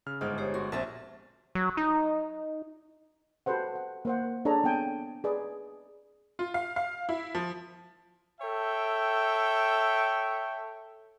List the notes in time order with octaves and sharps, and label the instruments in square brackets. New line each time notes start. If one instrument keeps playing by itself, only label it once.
[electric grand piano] C#3 F6
[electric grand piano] G1 G#3 F6 [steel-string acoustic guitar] G#2
[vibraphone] G4 C5 C#5
[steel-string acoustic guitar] F#4 [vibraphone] C6
[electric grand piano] A#1 A6 [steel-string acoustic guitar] E2 C4 A5 [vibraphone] E5
[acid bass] F#3
D#4
[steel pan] F#4 G4 A4 B4 C5 F#5
F#5
A#3 C5 F#5
D4 G#4 A4 C#5 E5 A#5
B3 C4 D4 G5 G#5
G#4 B4 D5
[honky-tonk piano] F4
F5
F5
E4
F3
[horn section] A4 C#5 E5 G5